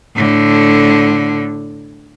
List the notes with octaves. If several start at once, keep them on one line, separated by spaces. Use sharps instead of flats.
A2 D3